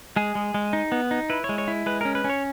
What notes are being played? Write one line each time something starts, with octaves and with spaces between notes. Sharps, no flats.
G#3 G#4
G#3
G#3
D#4
B3
D#4
E4 B4
C#5
G#3
C#5
E4
G#3 B4
C#4 A#4
B4
C#4
C#5